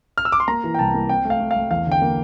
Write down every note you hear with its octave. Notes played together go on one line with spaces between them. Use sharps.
F6
E6
D6
C6
A#3 A#5
E3
G5
C2 A5
A#3
C4 G5
A3
F5
A3
F5
A3
E2 F5
D3
G5
A#3